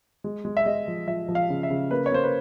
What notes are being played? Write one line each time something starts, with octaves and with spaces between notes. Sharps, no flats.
G#3
G#3
E5
G#3 D#5
F3
F3 E5
F3
F5
C#3
E5
C#3
A#3 B4
C#5
A#3 C5
B4